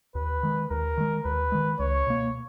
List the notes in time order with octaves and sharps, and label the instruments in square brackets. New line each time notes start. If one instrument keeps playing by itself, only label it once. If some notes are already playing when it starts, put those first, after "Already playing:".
[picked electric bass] D#2 [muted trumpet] B4
[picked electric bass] D#3 G#3
[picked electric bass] D#2 [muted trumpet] A#4
[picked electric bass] D#3 G#3
[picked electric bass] D#2 [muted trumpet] B4
[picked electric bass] D#3 G#3
[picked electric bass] C#2 [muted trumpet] C#5
[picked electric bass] B2 A#3